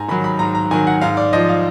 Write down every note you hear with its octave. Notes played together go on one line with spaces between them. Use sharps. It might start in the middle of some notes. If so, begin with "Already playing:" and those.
Already playing: G#2 G#5 A#5
D#3 F#3 B5
B5
G#2 A#5
A#5
D#3 F#3 G#5
F#5
G#2 F5
D5
F3 D#5
F5